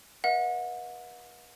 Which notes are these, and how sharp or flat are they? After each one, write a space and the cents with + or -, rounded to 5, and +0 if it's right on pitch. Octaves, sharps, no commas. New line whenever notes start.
B4 -35 D#5 +40 F#5 -40